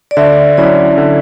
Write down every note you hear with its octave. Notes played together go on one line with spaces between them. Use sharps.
D5
D3 E5
F#3 C#4 E4 D5
D3